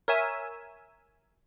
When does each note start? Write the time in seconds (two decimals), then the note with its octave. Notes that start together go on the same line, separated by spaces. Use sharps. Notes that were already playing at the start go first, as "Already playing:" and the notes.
0.08 A#4 C#5 E5 G#5 E6